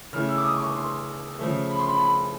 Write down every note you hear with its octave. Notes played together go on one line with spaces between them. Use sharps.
C#3 E3 A3 F6
E6
D6
D#6
C#6
D6
C6
C#3 F3 A3
B5
C6
B5
B5